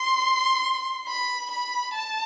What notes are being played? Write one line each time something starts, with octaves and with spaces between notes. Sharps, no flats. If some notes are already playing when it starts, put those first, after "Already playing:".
Already playing: C6
B5
B5
A5